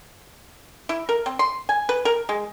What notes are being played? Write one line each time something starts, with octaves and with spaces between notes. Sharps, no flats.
E4
A#4
C4
C6
G#5
B4
A#4
G#3